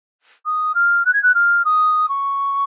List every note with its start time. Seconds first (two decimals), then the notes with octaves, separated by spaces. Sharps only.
0.46 D#6
0.75 F6
1.05 F#6
1.13 G#6
1.23 F#6
1.34 F6
1.65 D#6
2.09 C#6